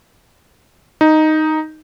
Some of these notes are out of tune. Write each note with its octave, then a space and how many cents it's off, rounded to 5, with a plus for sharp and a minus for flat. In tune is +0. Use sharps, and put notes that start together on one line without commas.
D#4 +0